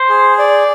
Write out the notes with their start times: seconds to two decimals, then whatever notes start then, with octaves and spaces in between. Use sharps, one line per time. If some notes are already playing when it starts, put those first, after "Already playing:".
Already playing: C5
0.09 G#4
0.38 D5